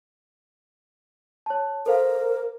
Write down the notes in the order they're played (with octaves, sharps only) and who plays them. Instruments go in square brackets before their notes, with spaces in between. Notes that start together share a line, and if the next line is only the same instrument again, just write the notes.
[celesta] C#5 A5
[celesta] A4 C5 F5 [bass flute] A#4